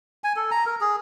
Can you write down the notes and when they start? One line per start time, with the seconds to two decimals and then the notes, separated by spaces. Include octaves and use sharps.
0.24 G#5
0.36 A4
0.51 A#5
0.66 A#4
0.81 G#4